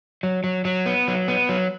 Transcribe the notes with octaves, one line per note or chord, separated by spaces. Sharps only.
F#3
F#3
F#3
B3
F#3
B3
F#3